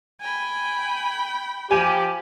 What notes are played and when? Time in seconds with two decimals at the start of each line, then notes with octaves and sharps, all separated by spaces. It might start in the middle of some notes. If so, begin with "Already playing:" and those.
0.22 G5 G#5 B5
1.71 F3 G4 G#5 D#7